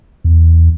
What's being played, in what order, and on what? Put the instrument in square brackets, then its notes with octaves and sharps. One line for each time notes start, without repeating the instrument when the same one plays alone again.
[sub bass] E2